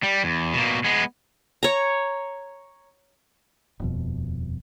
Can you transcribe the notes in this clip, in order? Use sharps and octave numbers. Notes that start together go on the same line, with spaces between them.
G3
E2
B2 A#3
G#3 B3
C#5 A#5
D#1 F2 B2